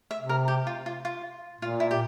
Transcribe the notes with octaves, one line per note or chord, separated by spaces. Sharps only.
E5
C3
A#4
G4
F4
F4
F4
A#2 F4
E4
G4